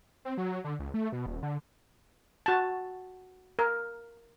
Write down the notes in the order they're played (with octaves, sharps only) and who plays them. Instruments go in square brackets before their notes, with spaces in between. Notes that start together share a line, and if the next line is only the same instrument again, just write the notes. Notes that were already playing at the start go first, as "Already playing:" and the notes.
[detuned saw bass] C4
F#3
D3
C#2
A3
B2
D#1
D3
[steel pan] F#4 A5
A#4